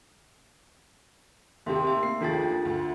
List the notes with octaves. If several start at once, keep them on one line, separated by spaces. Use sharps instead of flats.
D#2 C3 A3 E5 C6
E5
A#3 C7
F1 D#2 D4 F4 G#4 A6
D2